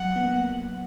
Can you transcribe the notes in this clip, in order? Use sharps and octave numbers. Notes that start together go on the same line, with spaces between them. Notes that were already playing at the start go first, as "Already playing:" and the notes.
Already playing: F#3 F#5
B3
A#3